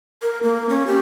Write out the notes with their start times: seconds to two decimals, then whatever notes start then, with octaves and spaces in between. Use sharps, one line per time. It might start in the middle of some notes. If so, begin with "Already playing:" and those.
0.22 A#4
0.43 A#3
0.69 C#4
0.87 G4